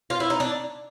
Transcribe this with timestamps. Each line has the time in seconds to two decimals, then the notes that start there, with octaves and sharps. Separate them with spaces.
0.10 F4
0.20 E4
0.30 D#4
0.40 D4